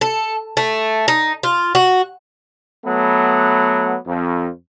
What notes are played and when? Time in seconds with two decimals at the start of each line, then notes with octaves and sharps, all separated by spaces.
0.01 A4
0.57 A3
1.08 D#4
1.43 F4
1.75 F#4
2.85 F#3 A3 B3
4.07 F2